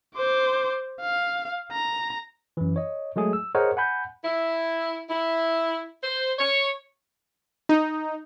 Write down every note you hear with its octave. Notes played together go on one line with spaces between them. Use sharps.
C5 D6
F5
A#5
F#2 E3
C#5 D#5
F#3 G#3 A3 G#4
E6
G#4 A#4 C5 C#5 D#5 F#5
F#5 G#5 B5 G6
E4
E4
C5
C#5
D#4